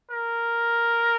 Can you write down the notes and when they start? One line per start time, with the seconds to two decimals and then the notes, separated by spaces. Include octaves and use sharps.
0.11 A#4